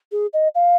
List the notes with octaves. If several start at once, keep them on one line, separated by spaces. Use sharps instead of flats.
G#4
D#5
F5